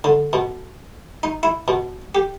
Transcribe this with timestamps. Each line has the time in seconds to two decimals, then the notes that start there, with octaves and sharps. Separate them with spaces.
0.04 D3
0.33 B2
1.23 D#4
1.43 E4
1.68 B2
2.15 G4